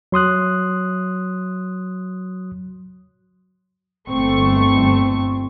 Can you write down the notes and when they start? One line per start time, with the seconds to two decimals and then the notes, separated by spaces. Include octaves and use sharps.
0.12 F#3 C6 D#6 F#6
4.10 G1 A3 C4 C#6